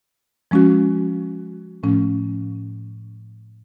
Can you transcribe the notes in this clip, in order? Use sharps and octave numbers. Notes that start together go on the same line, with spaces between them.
F3 G#3 C#4 F#4
A2 F3 A3 C#4